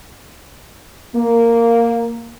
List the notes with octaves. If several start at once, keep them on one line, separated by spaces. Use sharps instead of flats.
A#3